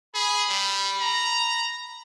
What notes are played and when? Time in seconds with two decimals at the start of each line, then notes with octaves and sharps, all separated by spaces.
0.15 G#4 B5
0.50 G3
1.01 A#5